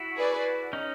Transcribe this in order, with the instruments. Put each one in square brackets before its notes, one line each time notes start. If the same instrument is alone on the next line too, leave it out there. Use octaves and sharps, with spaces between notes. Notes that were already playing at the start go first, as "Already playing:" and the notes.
Already playing: [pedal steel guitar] E4 F#4
[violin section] G#4 B4 D5
[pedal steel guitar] C#4 D#4